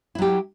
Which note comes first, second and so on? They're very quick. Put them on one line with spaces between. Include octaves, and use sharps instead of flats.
E4 F#3 G4